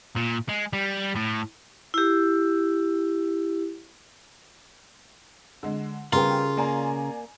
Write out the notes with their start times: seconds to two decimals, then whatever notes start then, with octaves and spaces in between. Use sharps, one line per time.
0.16 A#2
0.49 G#3
0.73 G3
1.16 A2
1.94 E4 G4
5.63 D3 G#3
6.13 C#3 G3 B3 F4 G4 G#4 A#4
6.57 A#3 D5 G#5 A#5